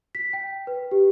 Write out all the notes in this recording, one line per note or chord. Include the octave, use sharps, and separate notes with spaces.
B6
G5
B4
G4